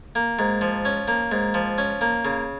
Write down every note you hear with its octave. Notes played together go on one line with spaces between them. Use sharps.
A#3
G#2
F3
C#4
A#3
G#2
F3
C#4
A#3
C#3